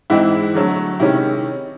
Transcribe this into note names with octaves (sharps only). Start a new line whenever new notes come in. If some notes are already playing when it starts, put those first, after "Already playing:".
G#2 E3 G#3 C4 D#4 E4
D3 F#3 A3
C3 D#3 G#3 C#4 E4